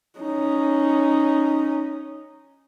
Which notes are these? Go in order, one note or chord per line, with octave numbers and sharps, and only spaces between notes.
C#4 D#4